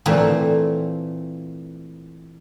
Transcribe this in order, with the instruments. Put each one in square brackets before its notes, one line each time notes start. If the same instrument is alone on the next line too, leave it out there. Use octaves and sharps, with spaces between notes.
[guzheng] A#2 E3 A3 A#3 C4